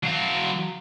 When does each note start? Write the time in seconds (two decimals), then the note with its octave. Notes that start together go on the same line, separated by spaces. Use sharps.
0.03 F#3 F5